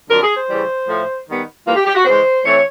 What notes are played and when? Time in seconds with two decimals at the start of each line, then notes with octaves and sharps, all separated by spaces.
0.09 F2 D3 F#3 A#4
0.22 G#4
0.36 C5
0.49 C#3 E3 G3
0.87 A2 F3 A3
1.27 D#3 G3 B3
1.66 G#2 E3 G3 A#3 F4
1.76 G4
1.86 G4
1.95 F#4
2.05 C#3 E3 G#3 C5
2.44 E3 A3 C4 C#5